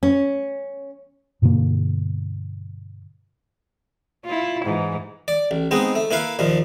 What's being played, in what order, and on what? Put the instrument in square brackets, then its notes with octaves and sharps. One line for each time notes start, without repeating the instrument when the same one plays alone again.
[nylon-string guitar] C#4
[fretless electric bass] G2 B2 D3 A#3
[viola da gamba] E4 F4
G#2 E3
[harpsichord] D5
A1
G#3 B3 C4 D#4
A3
A#3 E4 B4 F5
D#2 A#2 F3